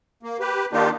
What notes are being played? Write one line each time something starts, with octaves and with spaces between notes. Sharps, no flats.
A#3
G4 B4
D#3 A#3 D4 D#4 F4 G4